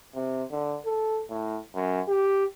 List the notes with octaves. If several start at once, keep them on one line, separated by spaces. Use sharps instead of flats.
C3
D3
A4
A2
F#2
G4